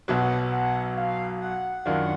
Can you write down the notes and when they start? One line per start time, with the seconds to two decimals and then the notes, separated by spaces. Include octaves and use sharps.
0.08 B1 B2 F#3 F#5
0.52 F#5
0.97 F5
1.42 F#5
1.85 F#2 D#3 F#3 D4 F4